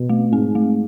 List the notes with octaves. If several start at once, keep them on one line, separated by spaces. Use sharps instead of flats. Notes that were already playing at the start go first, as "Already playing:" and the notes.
Already playing: B2
A3
G#2 C4
A3